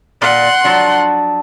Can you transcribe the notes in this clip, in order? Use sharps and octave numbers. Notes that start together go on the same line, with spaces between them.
A#2 D5 F#5 C6
F3 F#3 D4